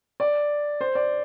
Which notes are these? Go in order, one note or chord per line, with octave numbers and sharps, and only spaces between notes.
D5
C5
D5